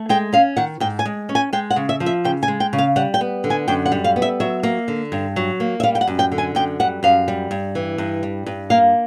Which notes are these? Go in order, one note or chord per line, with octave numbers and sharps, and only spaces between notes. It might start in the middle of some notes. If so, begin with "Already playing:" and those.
Already playing: A3
G#3 G5
C#4 F5
D#3 F#5
G#2 G5
G#5
G#3
C#4
G#5
G#3 G5
F#5
C#3
E5
F3
E5
C#3 G5
G#5
G#3
G5
C#3
F5
G3 F#5
G5
B3
D3
G#5
F#2 G5
F#5
G3
F5
B3
E5
F#3 E5
A#3
D3
G2
F#3
A#3
E5
G3 F5
G5
F#5
F#2
G5
D3
G#5
F#2 G5
G3 F#5
F#2 F5
G3
G2
E3
G2
G3
G2
A#3 F5